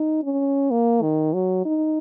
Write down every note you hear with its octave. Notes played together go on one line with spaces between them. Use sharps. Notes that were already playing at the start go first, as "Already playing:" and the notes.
Already playing: D#4
C#4
A#3
D#3
F#3
D#4